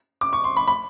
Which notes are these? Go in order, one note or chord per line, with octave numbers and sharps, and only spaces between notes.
D6
C#6
C6
B5
B5